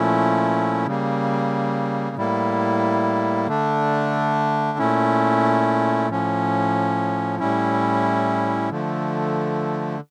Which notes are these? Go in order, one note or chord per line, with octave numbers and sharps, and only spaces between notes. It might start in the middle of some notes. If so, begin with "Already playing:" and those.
Already playing: A#2 F3 A3 C#4 E4
C#3 G3 A#3
A2 G3 A#3 E4
D3 A3 D4
A#2 A3 C#4 E4
A2 F3 C#4
A2 G3 C#4 E4
D3 F3 A3